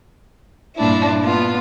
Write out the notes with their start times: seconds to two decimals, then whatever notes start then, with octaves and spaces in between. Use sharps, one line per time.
0.76 G2 A#2 D4 E4
1.23 B3 F4